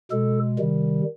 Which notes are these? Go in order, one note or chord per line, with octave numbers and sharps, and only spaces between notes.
B2 G#3 A4
C3 D#3 G3